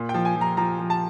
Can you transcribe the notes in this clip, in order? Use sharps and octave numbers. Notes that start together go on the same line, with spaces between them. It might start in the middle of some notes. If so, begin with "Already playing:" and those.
Already playing: A#2
G5
F3
G#5
F3
A#5
F3 A#5
F3
A5